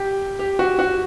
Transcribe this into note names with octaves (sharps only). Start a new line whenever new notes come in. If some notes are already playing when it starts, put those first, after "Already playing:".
Already playing: G4
G4
F#4
F#4